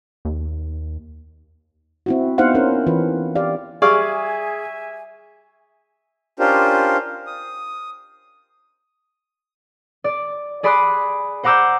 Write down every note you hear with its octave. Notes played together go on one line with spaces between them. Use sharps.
D#2
C4 E4 F#4
B3 D#4 E4 C5 F5 F#5
C4 C#4 D#4 A#4
E3 F4 B4
G4 D5 F5
G3 G#4 D5 E5 F5 G#5 C#6
C#4 D4 F4 G4 A#4 C5
D#6
D5
G#4 D5 B5 C6 D#6 F#6
C5 F#5 A#5 D6 E6 G6